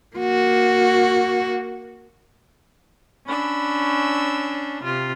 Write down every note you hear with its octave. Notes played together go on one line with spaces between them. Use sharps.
A#3 F#4
C#4 D4 B5 E6
C3 F4